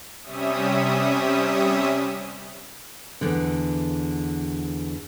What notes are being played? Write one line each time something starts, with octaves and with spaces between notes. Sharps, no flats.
C3 G3 C#4 E5 D#6
E2 G2 D3